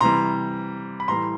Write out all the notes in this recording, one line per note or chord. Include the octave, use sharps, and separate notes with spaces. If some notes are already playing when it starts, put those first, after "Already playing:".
C3 E3 G3 A#5 C6
B5
A2 E3 G3 A#5 C6